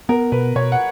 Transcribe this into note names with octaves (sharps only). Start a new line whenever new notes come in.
B3 A#4
B2 B4
B2 C#5
F#5